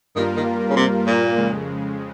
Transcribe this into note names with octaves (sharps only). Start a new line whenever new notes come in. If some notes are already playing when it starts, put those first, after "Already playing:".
G2 D#3 G3 A#3 F4 A#4
D#3
C#3
C3
A#2
F2 C#3 G#3